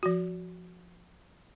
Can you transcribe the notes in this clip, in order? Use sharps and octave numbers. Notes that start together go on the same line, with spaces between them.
F3 F#4